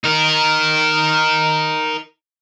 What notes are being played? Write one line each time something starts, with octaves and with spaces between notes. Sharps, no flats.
D#4 A#4